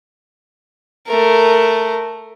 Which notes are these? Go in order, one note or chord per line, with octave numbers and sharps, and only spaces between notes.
A3 A#4